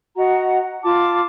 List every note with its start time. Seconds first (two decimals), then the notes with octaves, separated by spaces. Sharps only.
0.16 F#4 D#5 F#5 A#5
0.82 F4 A5 D6